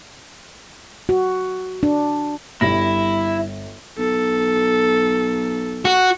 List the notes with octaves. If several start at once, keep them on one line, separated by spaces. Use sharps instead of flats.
F#4
D4
G1 G3 E4 A#6
B1 A4
F#4